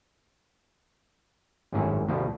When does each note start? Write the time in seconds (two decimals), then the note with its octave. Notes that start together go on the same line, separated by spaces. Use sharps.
1.72 G#1 F#2 A2 C#4 G#4 E5
2.08 D2 B2 F3 G3 A3